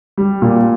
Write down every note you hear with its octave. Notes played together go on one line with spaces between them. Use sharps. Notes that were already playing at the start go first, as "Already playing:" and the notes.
G3
A#2